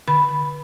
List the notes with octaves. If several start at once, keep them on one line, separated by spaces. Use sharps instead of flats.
D3 B5